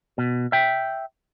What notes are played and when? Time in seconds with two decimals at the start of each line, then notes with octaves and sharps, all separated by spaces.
0.18 B2
0.52 E5 G5